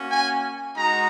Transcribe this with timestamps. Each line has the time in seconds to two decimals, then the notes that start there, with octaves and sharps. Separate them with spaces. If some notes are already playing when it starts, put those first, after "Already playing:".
Already playing: A#3 C#4 F#4
0.10 G#5
0.76 G#3 D#4 F#4 A#5